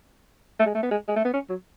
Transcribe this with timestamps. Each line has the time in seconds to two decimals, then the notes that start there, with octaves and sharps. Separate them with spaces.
0.60 A3
0.66 G#3
0.75 A3
0.83 B3
0.91 G#3
1.08 G#3
1.16 A3
1.25 B3
1.34 C#4
1.50 F#3